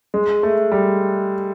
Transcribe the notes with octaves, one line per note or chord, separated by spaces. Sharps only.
G#3
A3
G3